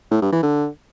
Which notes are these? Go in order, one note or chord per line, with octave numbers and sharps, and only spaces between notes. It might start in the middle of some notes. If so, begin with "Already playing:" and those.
A2
G2
E3
D3